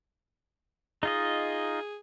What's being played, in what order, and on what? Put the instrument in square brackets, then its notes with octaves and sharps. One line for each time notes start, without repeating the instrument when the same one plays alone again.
[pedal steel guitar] D#4 F4 D#5 [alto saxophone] G#4